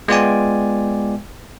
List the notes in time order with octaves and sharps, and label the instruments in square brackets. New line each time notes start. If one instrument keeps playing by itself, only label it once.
[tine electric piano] G#3 B3 F4 D5 G5 G#5